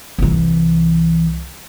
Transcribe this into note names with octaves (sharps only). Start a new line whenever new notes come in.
C2 E3